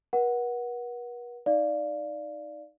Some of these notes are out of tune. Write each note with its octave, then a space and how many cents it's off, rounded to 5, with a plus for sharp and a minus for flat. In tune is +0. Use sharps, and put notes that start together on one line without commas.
B4 -45 F#5 +0
D#4 +0 D5 +0 F5 +0